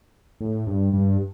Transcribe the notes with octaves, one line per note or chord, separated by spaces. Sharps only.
A2
G2
G2